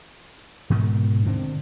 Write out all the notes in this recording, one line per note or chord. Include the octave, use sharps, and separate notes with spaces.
G#2 B2 D#3
D3 D#3 G#3 C4